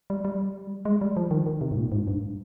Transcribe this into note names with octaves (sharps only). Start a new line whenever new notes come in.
G3
G3
G#3
G3
F3
D#3
D#3
C3
G#2
A#2
G#2
G2